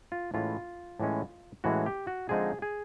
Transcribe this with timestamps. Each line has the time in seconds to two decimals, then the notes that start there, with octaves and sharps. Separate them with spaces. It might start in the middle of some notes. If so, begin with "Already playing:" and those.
0.12 F4
0.34 A2 E3 G#3 C#4 F4
1.00 A2 E3 G#3 C#4
1.64 A2 E3 G#3 C#4 F#4
1.86 G4
2.07 F#4
2.29 D3 F3 G#3 C4 D#4 G#4
2.62 G#4